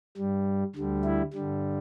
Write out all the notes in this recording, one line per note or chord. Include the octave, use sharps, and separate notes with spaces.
G2 G3
D2 D3 G3
E4
G2 D3 G3